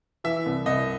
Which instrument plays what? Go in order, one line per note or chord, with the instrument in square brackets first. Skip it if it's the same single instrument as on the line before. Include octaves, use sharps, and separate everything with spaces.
[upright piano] E3 [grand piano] E5
[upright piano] C2
[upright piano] C2 [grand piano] D#5